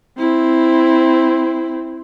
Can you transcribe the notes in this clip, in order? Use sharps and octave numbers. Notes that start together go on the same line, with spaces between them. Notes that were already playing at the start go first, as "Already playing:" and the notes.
C4 E4